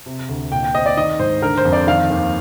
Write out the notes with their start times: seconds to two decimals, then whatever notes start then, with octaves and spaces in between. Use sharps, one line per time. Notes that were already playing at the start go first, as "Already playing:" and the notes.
0.06 C3
0.29 D2
0.52 A#2 G5
0.63 G5
0.75 C4 D#5
0.86 D5
0.97 D#3 D#5
1.19 G#2 C5
1.42 D3 A#4
1.57 C5
1.65 F2
1.73 D5
1.87 D#3 F5
2.10 D#2